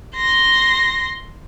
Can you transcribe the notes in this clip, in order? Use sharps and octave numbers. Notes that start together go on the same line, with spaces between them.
C6 A#6